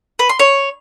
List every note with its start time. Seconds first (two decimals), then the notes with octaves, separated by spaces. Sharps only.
0.19 B4
0.29 C6
0.39 C#5